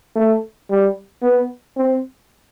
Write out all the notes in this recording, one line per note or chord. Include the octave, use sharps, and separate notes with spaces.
A3
G3
B3
C4